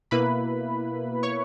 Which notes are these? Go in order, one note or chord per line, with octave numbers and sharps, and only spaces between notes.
B2 A#3 E4 B4 B5
C#5 C#6